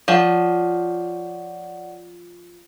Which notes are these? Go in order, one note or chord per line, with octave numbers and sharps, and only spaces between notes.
F3 C#5 D5 F#5